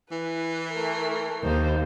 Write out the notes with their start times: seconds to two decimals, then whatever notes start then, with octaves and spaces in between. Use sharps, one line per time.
0.11 E3 B4
0.73 A3 A#4
1.44 D#2 D#4 C5